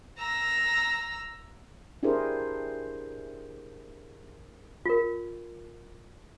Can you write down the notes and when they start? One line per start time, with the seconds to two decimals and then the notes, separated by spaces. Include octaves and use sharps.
0.18 A#5 E6
2.03 D4 E4 G4 G#4 A#4 C5
4.85 F4 A#4